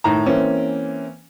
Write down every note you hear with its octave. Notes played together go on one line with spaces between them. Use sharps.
A2 D#3 A#5
E3 A#3 C4 C#4